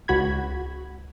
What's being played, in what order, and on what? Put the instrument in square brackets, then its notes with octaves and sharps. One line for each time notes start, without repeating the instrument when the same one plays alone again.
[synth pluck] C#2 F#4 B5 G#6